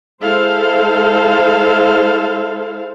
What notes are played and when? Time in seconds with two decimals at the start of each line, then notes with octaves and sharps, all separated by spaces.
0.22 G#3 E4 A4 C5 F5